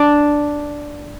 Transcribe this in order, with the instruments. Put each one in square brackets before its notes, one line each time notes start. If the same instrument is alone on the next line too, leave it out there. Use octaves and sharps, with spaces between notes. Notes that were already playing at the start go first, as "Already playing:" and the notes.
Already playing: [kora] D4